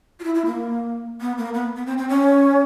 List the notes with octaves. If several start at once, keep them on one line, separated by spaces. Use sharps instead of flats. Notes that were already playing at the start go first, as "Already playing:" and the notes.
F4
E4
E4
A#3
B3
A#3
B3
B3
C4
C4
C#4